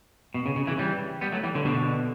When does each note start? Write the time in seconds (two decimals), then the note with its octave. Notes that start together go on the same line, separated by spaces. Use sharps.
0.34 B2
0.46 C#3
0.56 C#3
0.67 C#3 E3
0.78 E3 G3
1.21 G3 B3
1.32 F#3 A3
1.43 E3 G3
1.54 D3 F#3
1.65 B2 D3